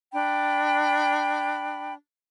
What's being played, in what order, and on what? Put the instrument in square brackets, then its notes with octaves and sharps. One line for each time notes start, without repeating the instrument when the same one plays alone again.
[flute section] D4 G5 B5